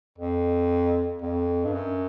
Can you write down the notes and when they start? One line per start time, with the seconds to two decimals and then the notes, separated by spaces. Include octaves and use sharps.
0.18 F2
1.22 F2
1.64 G2
1.73 F#2